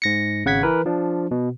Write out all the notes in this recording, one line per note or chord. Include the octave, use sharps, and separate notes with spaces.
G#2 A#6 C#7
G#1 C#3 F#5 G#6 B6
E3 A#4 B4
F3 D4
B2